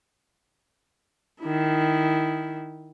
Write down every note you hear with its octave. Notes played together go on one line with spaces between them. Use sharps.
D#3 E4